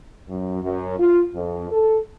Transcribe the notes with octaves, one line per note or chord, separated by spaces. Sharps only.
F#2
F#2
F4
F2
A4